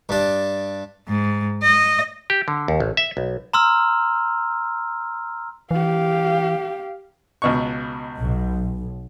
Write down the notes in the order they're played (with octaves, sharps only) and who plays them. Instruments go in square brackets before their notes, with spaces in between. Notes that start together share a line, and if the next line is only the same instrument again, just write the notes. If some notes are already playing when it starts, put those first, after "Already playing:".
[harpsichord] G2 D4
[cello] G#2
D#5
[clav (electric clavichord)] G4
D3
D#2
A1
E5
B1
[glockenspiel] A#5 C6 E6 F6
[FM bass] E3 [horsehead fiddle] G4 F5
[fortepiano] C#2 B2 C#6
[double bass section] B1